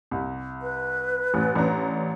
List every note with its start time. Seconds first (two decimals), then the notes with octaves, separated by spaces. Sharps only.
0.11 C2
0.62 B4
1.34 A1
1.55 A1 D4 A#5